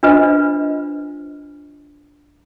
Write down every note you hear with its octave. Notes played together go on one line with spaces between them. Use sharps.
D4 F4 B4 C5 D#5